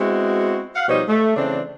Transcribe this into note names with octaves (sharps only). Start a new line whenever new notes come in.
G#3 B3 C4 E4 F#4
F5 F#5
B2 F3 G3 D#4 C5 C#5
A3
C#3 E3 C4 D4